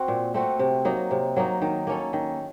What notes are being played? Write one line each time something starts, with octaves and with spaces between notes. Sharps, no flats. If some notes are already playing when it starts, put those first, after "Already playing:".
Already playing: C4 F#4
A#2
A3 C4 F#4
C3
F#3 A#3 D#4
C3
F#3 A#3 D#4
D#3
A#3 C#4 A4
D#3